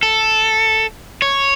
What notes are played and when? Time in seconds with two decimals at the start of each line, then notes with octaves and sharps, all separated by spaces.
0.03 A4
1.22 C#5